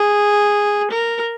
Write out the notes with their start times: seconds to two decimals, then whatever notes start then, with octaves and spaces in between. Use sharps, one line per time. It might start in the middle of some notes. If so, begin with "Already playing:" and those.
Already playing: G#4
0.91 A#4